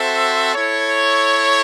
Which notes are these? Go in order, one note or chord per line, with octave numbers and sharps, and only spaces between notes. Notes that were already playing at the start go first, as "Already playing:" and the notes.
Already playing: C4 F#4 A4 C5 E5
E4 A4 C#5